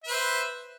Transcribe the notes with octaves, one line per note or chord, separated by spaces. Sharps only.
B4 C5 E5